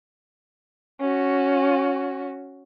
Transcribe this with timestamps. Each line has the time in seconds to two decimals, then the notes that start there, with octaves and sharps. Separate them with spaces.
1.01 C#4 F#4